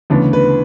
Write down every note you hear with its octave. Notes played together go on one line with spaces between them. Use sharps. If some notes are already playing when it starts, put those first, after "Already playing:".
D2 C#3 E3 B3 D4
B4